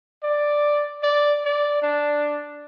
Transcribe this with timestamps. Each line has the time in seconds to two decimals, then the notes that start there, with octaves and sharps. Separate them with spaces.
0.23 D5
1.03 D5
1.45 D5
1.82 D4